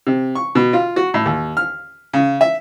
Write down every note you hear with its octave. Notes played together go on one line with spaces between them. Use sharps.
C3
C#6
B2
F4
F#4
A2
D#2
F6
C#3
E5